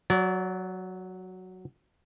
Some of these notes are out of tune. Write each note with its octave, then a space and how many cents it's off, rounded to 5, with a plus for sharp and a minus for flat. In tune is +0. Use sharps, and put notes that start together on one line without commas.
F#3 +0 D5 -30